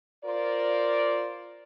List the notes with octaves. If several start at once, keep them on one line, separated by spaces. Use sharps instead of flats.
F4 A#4 C5 D5